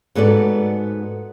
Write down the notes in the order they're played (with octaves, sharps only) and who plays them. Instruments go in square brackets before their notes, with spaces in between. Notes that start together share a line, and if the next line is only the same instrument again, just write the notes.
[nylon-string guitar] G#2 B3 F#4 A4 D5